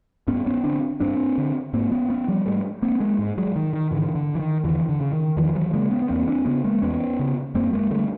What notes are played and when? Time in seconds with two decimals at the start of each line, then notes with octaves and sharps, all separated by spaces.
0.28 G2 B3 C#4
0.46 B3 C#4
0.64 D3 C4 D4
1.00 G2 C4 D4
1.38 D3
1.74 G#2 A#3 C4
1.92 B3 C#4
2.10 B3 C#4
2.28 F3 G3
2.46 G#2 G3 A3
2.82 A#3 C4
3.00 G#3 A#3
3.19 G#2
3.38 F#3 G#3
3.56 D#3
3.73 D#3
3.91 G#2 D3 E3
4.15 D3
4.35 E3
4.40 D#3
4.64 E2 D3 E3
4.89 D3
5.01 C#3
5.13 D#3
5.37 E2 D#3 F3
5.55 E3 F#3
5.73 C#3 G#3 A#3
5.91 B3 C#4
6.02 B3
6.09 E2 A#3 C4
6.28 C4 D4
6.46 C#3 B3 C#4
6.64 G#3 A#3
6.82 E2 B3 C#4
7.19 C#3
7.55 F#2 A#3 C4
7.73 G#3 A#3
7.91 D3 G3 A3